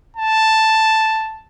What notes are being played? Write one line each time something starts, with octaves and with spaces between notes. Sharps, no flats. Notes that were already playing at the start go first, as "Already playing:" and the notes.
A5